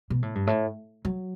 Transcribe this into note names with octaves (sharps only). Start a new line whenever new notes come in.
B2
A2
G2
A2
F#3